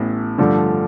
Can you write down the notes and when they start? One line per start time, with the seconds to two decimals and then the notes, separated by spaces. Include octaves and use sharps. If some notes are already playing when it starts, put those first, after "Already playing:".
Already playing: A1 A2 E3 B3
0.38 G2 D3 F3 A3